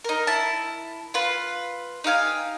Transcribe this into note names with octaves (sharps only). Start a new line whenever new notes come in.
D#4 A#4
E4 A5
F4 B4
D#4 G4 F5 G#5